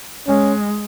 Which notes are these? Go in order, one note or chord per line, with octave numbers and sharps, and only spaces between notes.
G#3 C#4